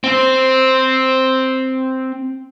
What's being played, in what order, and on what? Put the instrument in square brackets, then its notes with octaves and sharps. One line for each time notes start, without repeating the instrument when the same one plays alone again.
[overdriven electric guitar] C4 C5